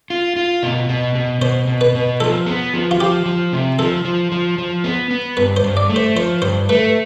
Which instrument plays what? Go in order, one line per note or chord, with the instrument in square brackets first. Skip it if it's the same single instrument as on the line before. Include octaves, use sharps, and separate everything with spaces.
[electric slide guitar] F4
F4
B2
B2
B2
[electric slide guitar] B2 [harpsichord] C5
[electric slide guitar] B2
[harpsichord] B4
[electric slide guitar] B2
[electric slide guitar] F3 [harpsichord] A4
[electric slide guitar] B3
F3
[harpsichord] F4
[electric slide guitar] F3 [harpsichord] G4
[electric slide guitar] F3
C3
[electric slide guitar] F3 [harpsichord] A4
[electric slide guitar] F3
F3
F3
B3
B3
[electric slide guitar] G2 [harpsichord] B4
[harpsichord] C5
[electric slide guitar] G2
[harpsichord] D5
[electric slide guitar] A3
[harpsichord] C5
[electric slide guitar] F3 [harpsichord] C5
[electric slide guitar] G2 [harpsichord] C5
[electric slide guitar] A3 [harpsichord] B4